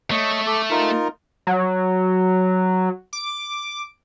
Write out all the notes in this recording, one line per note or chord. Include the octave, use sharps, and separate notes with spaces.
A3 C#5 D#5
A4 D6
D#4 F4 A#4
F#3
D6